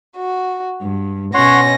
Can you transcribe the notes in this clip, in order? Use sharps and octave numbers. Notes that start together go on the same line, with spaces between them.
F#4
G2
B2 C#4 C#5 F#5 C6 A#6